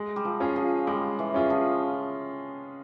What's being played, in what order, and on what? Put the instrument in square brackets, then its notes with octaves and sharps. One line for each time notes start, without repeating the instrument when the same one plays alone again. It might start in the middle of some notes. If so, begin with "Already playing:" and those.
Already playing: [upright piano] G#3
[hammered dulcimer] G3
F3
[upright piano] C#4 F4 G#4
[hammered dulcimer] F3
[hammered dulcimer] G3 [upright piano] G#3
[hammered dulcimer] E3
[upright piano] C#4 F4 G#4
[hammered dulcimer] F3